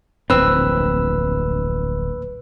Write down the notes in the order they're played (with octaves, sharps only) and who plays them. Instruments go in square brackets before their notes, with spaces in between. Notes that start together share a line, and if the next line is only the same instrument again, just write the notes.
[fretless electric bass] D1 A#1 C4 [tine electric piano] B4 E6